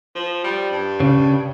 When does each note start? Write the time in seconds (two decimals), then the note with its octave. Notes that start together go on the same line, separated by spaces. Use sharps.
0.15 F3
0.44 G3
0.71 G2
1.00 C#3